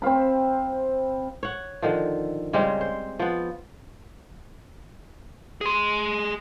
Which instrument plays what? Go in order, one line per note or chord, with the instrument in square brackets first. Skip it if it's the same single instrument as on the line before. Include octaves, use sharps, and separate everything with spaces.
[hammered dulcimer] C4 C5 F5 B5
[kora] C#5 F#5
D3 D#3 F3
C#3 G3 G#3 C4
C5
F3 B3
[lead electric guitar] G#4 C6